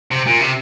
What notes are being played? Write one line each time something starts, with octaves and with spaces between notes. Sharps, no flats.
C3
A#2
C3